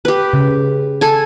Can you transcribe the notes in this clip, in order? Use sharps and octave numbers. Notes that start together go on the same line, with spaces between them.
G4 B4
C#3
A4 G#5